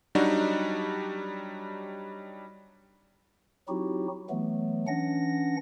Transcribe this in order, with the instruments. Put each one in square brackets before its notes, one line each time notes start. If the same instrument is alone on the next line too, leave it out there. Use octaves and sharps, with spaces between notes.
[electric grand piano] F#3 G3 D4 D#4 F#4
[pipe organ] F#3 C4 D#4 E4 F#4 G4
E3 F#3 A3 B3
E3 C#4 D4 F#5 A#6